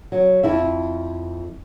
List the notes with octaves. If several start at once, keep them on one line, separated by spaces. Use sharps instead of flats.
F#3
F2 E4 E5